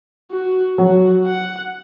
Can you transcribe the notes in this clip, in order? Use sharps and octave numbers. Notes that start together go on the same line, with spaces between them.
F#4
F#3 F#4
F#5